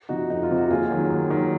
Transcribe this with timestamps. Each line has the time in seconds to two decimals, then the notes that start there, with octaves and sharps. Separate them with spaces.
0.09 C3 F3 D#4 F#4
0.30 F2 D#4
0.43 F4
0.51 C3 F3
0.57 F#4
0.70 D#2 F4 G#4
0.90 D#3 F#3
1.10 D#2
1.30 D#3 F#3